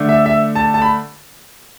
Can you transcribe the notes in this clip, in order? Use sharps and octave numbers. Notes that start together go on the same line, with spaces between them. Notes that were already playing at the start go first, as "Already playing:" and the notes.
Already playing: D3 A3 D4
E5
E5
A5
A5
B5